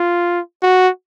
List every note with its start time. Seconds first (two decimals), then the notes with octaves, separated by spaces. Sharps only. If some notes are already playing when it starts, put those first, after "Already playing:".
Already playing: F4
0.63 F#4